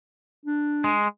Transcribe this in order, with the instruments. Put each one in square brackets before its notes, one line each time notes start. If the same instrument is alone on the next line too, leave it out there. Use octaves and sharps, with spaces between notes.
[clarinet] D4
[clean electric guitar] G#3